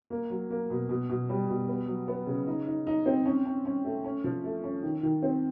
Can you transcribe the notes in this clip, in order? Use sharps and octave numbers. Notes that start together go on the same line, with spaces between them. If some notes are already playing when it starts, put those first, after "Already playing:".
A#3
F#3
A#3
B2
B2
B2
G3
B2
B3
F#3
B3
C#3
D#4
D#4
D#4
C4
C#4
C#4
C#4
A3
C#4
F3
A3
C#4
D#3
D#3
C4